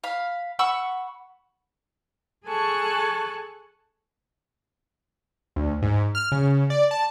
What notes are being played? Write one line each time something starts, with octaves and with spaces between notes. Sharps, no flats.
F5 B5
F#5 B5 C#6 E6
G#4 A4 G#5 A5 C#6 F#6
D2
G#2
F6
C#3
D5
A5